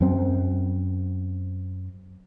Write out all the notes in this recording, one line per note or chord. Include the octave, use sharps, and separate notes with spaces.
F#2 C4